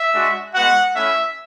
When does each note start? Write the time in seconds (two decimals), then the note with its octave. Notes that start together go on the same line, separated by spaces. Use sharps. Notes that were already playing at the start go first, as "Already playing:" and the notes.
Already playing: E5
0.14 G#3 D4 F#4
0.55 G#3 B3 F#4 F#5
0.95 A3 C#4 E4 E5